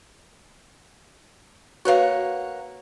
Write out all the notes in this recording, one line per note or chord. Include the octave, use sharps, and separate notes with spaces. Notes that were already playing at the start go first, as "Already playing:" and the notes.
A#3 F#4 B4 C#5 F5 F#5